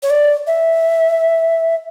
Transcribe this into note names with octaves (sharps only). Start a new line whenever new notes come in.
C#5
D5
E5